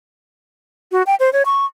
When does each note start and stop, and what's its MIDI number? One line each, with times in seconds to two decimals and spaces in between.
0.92 1.03 66
1.07 1.15 79
1.20 1.30 72
1.33 1.43 73
1.45 1.65 85